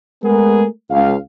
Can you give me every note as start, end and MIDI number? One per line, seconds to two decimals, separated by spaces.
0.24 0.65 56
0.24 0.65 57
0.24 0.65 59
0.24 0.65 68
0.24 0.65 70
0.91 1.16 37
0.91 1.16 77